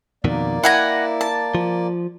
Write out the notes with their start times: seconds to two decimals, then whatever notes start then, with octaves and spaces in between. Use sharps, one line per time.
0.24 F2 B2 D#3 A#3 D5
0.64 E4 F#5 G#5 A#5
1.21 A5
1.55 F3